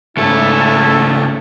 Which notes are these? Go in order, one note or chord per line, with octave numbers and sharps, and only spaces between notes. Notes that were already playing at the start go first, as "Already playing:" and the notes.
C#2 G#2 A3 C#4 E4 A4